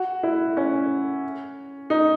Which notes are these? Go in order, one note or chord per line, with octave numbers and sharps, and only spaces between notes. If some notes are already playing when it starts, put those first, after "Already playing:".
Already playing: F#4
E4
C#4
D#4